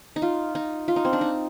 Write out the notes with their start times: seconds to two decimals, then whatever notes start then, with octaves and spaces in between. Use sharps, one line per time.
0.16 D#4
0.22 F4
0.55 D#4
0.88 F4
0.96 D#4
1.05 C4
1.13 D4
1.21 D#4